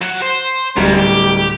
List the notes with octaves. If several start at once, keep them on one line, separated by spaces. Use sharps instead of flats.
F#3 F#5
C5
D1 F#2 G3
G4